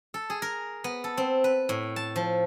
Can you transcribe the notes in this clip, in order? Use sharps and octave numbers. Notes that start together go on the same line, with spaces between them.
A4
G#4
A#4
B3
A4
C4
B4
A2
A5
F3